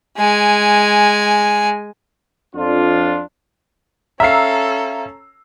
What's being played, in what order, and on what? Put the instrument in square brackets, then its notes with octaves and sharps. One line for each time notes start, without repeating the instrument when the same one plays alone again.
[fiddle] G#3 G#5
[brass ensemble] F2 D4 F4
[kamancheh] C#4 A4 [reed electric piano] E5 F5 [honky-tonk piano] A#5 E6 C7